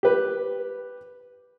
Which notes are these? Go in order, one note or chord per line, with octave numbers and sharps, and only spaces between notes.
G4 B4